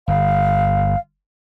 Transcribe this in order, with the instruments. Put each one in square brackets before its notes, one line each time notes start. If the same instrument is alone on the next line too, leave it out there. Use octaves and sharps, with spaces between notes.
[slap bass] G1 [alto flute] F5